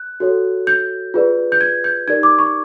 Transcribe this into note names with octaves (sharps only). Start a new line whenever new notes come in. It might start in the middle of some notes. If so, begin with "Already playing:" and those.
Already playing: F#6
F#4 A4 C#5
G6
F4 G#4 B4 D5
G6
G#6
G6
D#4 G4 A#4 D5 G#6
D6
C#6